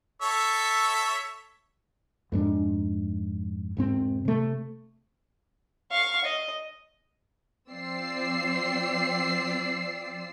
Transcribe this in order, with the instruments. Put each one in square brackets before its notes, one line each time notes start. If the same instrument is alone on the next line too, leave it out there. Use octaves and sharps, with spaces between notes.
[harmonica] A4 C#5 E5
[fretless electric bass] F2 G#2 A3 D4
E1 G#2 C4
C3 A3
[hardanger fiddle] F5 C#6
D#5
[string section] F3 C4 D5 E6 C7